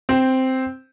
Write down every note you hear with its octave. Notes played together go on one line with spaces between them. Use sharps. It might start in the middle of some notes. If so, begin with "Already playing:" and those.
C4